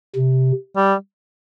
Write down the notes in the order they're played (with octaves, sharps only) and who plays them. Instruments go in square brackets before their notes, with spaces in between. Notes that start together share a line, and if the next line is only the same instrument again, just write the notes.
[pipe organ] C3
[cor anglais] G3